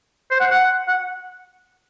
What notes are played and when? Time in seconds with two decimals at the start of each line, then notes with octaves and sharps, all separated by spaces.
0.31 C5
0.40 F#5
0.50 F#5
0.88 F#5